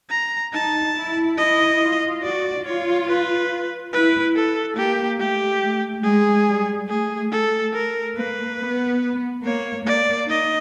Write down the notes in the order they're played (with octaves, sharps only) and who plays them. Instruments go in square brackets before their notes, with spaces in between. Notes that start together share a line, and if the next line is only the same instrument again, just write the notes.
[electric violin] A#5
[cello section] D#4 [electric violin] A5
[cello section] E4
[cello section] E4 [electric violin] D#5
[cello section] F4
[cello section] F#4 [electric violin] D5
[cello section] F4 [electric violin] C#5
[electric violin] B4
[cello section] E4 [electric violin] B4
[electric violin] A4
[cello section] A#3 [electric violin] G4
[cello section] A3 [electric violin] G4
[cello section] A3
[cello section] G#3 [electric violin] G#4
[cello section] G3
[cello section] A3 [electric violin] G#4
[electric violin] A4
A#4
[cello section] A#3 [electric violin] B4
[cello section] B3
[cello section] A#3 [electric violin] C#5
[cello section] A#3 [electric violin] D5
[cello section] D#4 [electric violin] D#5